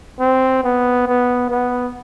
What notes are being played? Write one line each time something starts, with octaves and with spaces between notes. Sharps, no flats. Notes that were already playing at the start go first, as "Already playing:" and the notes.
C4
B3
B3
B3